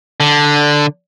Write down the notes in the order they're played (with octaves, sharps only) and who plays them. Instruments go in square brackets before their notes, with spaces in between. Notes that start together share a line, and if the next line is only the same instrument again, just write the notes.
[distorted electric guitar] D3